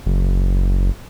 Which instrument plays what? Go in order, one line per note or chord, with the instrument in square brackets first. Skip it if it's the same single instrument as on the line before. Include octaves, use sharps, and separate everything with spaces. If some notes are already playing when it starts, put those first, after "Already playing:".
[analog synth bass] F#1